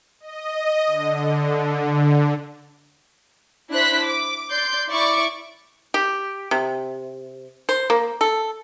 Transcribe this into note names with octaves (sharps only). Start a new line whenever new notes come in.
D#5
D3
D4 E4 C5 F#6 B6
D6
D5 C6 G6
E4 D5 C#6 D6
G4
C3
C5
A#3
A4